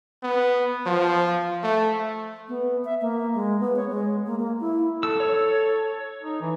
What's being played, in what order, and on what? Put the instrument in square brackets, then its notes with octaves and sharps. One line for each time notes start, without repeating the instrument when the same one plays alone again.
[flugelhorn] B3
F3
A3
[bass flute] B3
E5
A#3
G#3
B3
C#5
G#3
A#3
A#3
E4
[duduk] A4 [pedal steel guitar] E6
[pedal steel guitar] C#5
[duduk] D#4
E3